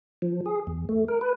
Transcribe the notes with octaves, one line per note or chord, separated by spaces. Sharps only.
F3
G#4
E2
A3
A#4
B4